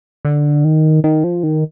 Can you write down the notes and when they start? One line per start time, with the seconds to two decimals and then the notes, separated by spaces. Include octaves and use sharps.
0.25 D3
0.64 D#3
1.04 D#3
1.24 F3
1.43 D#3